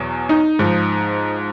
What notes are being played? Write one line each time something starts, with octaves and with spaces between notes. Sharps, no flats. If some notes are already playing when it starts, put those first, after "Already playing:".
Already playing: E2 B2 F#3
D#4
G#2 F3